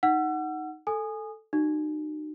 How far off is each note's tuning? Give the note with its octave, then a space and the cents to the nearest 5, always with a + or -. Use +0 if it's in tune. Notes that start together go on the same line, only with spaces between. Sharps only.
D#4 +0 F#5 +5 E6 +40
A4 +0 G#5 +0 D#6 -20
D#4 -35 F#4 +25